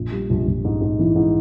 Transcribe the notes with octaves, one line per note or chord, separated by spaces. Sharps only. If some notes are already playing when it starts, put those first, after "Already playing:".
Already playing: A#1
G3
A#1
A#1
G#2
G#2
E3
G#2